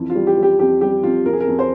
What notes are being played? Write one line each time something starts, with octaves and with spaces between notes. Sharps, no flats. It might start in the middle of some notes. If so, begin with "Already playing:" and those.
Already playing: F2 E3
F4
G3
G4
G3
G4
F2 G4
G3 G4
F2 F4
F2 A#4
G#4
A#4
F2
C5